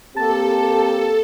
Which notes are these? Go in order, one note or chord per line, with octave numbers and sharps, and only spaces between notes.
A#3 C4 G4 A4 A5